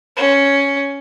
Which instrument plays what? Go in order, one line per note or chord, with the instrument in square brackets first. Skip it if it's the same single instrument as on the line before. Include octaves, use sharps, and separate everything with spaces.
[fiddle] C#4